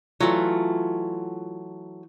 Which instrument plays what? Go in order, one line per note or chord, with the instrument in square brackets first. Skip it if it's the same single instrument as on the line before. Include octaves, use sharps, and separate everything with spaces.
[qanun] E3 F4 [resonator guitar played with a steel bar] F#3 A3